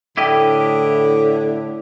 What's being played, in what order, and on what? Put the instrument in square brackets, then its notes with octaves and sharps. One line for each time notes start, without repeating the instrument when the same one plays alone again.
[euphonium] A2 [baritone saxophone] D3 [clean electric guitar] E4 G4 D#5 [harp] G5 F6